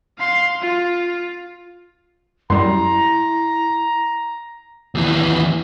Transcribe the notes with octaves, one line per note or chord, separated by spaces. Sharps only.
F5 C6
F4
F#2 G3 E4 A#5 C6
D#2 E3